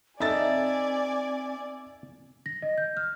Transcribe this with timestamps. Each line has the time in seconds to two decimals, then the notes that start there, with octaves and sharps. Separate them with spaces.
0.20 C4 D#4 A4 D5 E5 G#5 A6
2.46 A#6
2.62 D#5
2.78 G6
2.97 F6